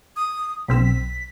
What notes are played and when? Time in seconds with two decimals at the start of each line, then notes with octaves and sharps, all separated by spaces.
0.16 D#6
0.68 B1 C4 E6 B6